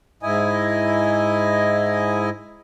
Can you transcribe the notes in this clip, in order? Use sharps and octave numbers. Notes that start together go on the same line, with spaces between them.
G#2 E4 D#5 G#5